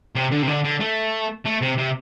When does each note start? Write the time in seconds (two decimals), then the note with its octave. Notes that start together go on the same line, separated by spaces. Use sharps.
0.15 C3
0.31 D3
0.42 C3
0.48 D3
0.64 D3
0.80 A3
1.46 A3
1.62 C3
1.78 C3